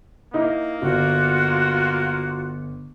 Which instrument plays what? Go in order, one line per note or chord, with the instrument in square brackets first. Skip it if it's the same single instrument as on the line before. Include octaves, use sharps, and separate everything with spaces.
[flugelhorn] A#3 [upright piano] D#4 E4
[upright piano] G1 [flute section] F4 F#4